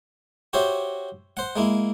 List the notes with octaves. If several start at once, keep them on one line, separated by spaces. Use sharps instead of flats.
F#4 G4 C5 C#5 E5
C5 F#5
G#3 A#3 E4